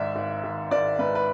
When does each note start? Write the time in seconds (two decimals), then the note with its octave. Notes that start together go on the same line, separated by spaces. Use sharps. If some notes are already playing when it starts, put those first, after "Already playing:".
Already playing: G#1 G#2 D5 E5
0.16 G#1
0.44 G#1
0.71 G#1 D5
0.99 G#2 B4
1.15 B4